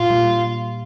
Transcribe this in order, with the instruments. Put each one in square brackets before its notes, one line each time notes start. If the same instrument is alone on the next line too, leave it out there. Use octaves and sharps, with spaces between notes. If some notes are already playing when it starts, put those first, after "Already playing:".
Already playing: [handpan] A#2 [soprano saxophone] F4
[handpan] G3